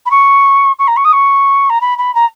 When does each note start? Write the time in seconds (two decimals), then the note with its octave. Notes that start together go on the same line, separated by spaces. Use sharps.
0.06 B5
0.11 C#6
0.79 C#6
0.87 A#5
0.96 C#6
1.04 D#6
1.12 C#6
1.69 A#5
1.81 B5
1.98 B5
2.15 A#5